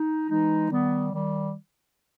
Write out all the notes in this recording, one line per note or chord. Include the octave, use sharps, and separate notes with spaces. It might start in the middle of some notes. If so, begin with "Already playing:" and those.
Already playing: D#4
E3 G#3 D#4
D#3 G3 B3
D#3 G3